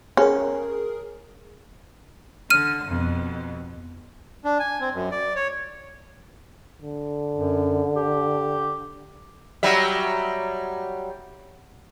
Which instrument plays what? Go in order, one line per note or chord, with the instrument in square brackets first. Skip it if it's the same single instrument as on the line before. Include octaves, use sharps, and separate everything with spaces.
[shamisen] C#4 [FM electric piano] G#4 A#4
[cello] D3 [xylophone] F6 D#7
[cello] F2 B2
[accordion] D4
G#5
C4
F#2
D5
C#5
[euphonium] D3
[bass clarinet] F#2
G4
[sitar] F#3 G3 E5